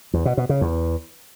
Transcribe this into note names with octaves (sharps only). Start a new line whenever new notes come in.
E2
B2
B2
C#3
E2